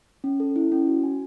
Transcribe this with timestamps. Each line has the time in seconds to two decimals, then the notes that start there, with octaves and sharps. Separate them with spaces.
0.24 C#4
0.40 A4
0.56 E4
0.72 C#4
0.87 F#4
1.04 G#5